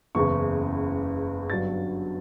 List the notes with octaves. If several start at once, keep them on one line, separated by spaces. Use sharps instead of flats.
F#1 E2 C#3 C#6
G1 G2 F#3 A6